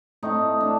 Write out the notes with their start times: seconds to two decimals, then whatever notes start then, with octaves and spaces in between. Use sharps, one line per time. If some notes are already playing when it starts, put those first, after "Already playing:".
0.23 A2 A3 C4 D#4
0.61 D4